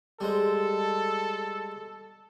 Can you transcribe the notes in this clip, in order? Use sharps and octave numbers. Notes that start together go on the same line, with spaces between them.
G3 G#3 A4 C5